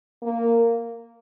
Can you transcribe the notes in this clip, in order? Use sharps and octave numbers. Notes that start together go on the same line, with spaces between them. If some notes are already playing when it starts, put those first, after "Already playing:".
A#3